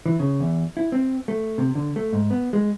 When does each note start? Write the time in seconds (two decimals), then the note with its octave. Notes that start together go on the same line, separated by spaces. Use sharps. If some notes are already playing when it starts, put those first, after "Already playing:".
0.06 E3
0.19 C#3
0.40 E2
0.77 E4
0.92 C4
1.28 A3
1.58 C3
1.75 D3
1.96 A3
2.13 G#2
2.30 B3
2.53 G#3